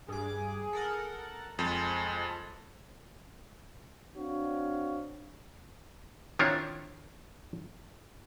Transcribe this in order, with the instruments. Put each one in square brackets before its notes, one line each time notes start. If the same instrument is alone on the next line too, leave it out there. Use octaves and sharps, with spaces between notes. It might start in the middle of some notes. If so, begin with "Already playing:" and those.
[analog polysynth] G2 D6 [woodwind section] G#4
[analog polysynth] A4 A#4 F#5
[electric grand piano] F2 [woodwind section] F3 G#3 [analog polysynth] A4
[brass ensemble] C4 D4 F#4 C#5 F5
[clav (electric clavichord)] D#3 C4 D4 E4 F4 C#5